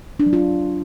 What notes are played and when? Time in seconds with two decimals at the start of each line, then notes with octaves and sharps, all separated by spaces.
0.20 D4
0.26 F#3
0.33 F4